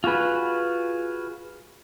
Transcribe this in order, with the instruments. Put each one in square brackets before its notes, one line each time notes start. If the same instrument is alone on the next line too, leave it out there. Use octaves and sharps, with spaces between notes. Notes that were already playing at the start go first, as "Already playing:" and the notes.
[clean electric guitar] F4 F#4 G#4 B4